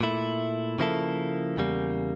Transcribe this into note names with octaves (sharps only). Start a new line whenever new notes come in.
A#2 A3 E4
C#3 F3 A#3 E4 A4
E2 C#3 G3 A#3